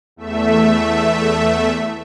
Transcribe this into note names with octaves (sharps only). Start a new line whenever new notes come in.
E2 A3 E5